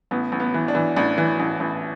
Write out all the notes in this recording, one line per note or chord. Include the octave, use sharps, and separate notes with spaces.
A1 B3
A1
B3
E3
D4
E3
A1 D4
E3
A1
A1